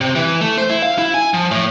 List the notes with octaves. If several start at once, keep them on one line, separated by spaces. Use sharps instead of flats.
C3
E3
A3
C5
E4
F5
E4
G#5
F3
A2